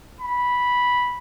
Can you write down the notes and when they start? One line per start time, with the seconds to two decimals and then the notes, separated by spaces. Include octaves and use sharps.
0.21 B5